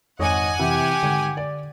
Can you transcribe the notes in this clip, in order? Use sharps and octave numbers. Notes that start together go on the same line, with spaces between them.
G#1 F2 C#5 D#5 F#5 G#5
C3 E3 G4
G#1 D3 G#6
D5